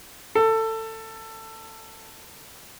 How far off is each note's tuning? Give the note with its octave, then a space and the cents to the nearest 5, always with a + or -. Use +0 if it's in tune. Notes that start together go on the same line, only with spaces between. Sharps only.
A4 +20